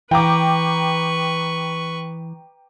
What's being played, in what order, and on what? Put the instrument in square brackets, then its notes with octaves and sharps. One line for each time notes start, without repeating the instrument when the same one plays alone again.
[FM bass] E3 [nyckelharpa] B4 C#6 [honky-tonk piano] G5 A#5 D6